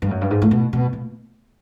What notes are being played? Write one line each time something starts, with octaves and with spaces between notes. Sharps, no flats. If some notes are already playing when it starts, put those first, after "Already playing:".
G2
F#2
G2
G#2
A2
B2
B2
A#2